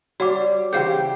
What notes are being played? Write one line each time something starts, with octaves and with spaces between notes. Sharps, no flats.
G3 F#4 C#5 F#5 D6
C#3 E3 G4 G#4 C5 F5 F#5 G6